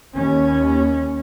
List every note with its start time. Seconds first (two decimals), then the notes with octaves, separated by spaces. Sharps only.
0.14 D#2 C#4